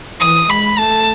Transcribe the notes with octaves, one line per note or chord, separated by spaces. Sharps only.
E3 D#6
G#3 B5
A3 A5